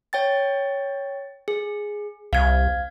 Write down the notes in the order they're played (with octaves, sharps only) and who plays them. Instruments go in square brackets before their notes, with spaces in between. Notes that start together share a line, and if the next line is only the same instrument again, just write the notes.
[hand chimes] C#5 G5 A6
G#4
[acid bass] C2 [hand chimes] F5 G#6